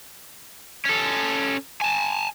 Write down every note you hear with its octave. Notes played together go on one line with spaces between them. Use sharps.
C#4 A4
G#5 A5